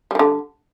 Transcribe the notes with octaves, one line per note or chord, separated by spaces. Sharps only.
D3 D#3 G3